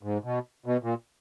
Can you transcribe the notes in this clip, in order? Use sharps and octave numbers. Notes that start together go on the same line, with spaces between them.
G#2
B2
B2
A#2